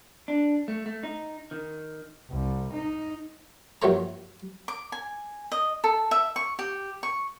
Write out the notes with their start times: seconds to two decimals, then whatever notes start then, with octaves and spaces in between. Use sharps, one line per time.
0.28 D4
0.68 A3
0.86 A3
1.03 D#4
1.51 D#3
2.30 C2
2.73 D#4
3.82 A#1 G2 F#3 A3 C#5 A#5
4.68 D6
4.92 G#5
5.52 D#5
5.84 A4
6.11 E5
6.36 C#6
6.59 G4
7.03 C#6